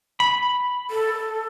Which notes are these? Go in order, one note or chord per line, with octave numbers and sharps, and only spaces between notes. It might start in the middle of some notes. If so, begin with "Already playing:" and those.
B5
A4